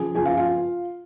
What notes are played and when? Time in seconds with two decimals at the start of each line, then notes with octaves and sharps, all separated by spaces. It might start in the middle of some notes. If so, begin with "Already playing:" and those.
Already playing: C#3 F3 G#4 G#5
0.15 C#3 F3 G#4 G#5
0.25 F4 F5
0.37 F4 F5